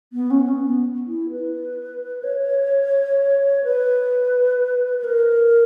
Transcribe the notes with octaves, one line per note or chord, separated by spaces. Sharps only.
B3
C#4
B3
B3
E4
B4
C#5
B4
B4
A#4